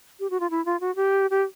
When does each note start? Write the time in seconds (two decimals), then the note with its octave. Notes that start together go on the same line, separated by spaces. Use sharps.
0.20 G4
0.30 F#4
0.40 F4
0.50 E4
0.65 F4
0.80 F#4
0.96 G4
1.31 G4